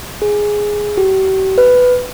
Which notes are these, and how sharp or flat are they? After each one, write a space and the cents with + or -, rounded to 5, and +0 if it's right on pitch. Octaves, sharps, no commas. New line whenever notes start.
G#4 +0
G4 -45
B4 +10